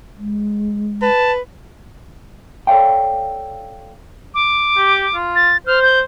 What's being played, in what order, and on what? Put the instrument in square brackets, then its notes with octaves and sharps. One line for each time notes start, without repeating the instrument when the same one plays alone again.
[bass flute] G#3
[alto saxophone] B4 [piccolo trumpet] A5
[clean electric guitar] A4 C#5 D5 F5 G5
[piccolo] D6
[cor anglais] G4
F4
[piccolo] A6
[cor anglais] C5 [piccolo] F6
[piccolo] G6